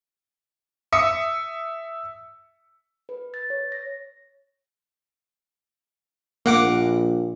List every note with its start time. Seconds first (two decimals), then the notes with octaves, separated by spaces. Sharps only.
0.93 E5 D#6 C#7
3.09 B4
3.34 A6
3.50 C#5
3.72 A#6
6.46 A#1 A#3 F#5 D6